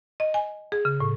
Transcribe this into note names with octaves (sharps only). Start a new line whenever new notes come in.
D#5
G#5
G#4
C#3
A2